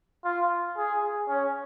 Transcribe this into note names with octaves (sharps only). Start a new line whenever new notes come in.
F4
G#4
C#4